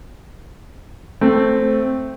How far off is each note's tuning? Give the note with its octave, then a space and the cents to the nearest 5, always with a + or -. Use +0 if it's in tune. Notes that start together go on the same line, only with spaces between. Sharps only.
A3 +0 C4 +0